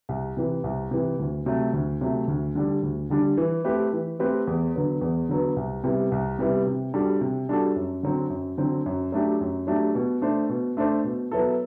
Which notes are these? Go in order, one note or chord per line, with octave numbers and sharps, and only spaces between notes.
C2
C3 E3
C2
C3 E3
D2
C3 F#3 A3
D2
C3 F#3 A3
D2
D3 G3 D4
D2
D3 G3 D4
E3
A3 C4 G4 B4
E3
A3 C4 G4 B4
E2
D3 F#3 B3
E2
D3 F#3 B3
C2
C3 G3 B3 E4
C2
C3 G3 B3 E4
C3
G3 D4 F#4 A4
C3
G3 D4 F#4 A4
F#2
D3 F#3 C4
F#2
D3 F#3 C4
F#2
F#3 A3 D4 G4
F#2
F#3 A3 D4 G4
B2
A3 D4 A4 C5
B2
A3 D4 A4 C5
B2
F#3 B3 E4 A4